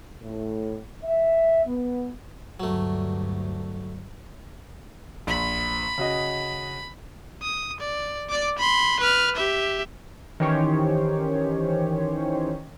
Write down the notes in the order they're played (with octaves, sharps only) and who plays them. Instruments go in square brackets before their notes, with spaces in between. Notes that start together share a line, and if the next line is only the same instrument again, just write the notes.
[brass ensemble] A2
E5
B3
[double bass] D2 G2 [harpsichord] F#3 A3
[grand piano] A#1 [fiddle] B5
[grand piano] C#3 F#4 D#5
[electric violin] D#6
D5
D5 D6
B5 C6
B4 F6
G4 E5
[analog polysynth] D#3 E3 C#4 G4 C5 C#5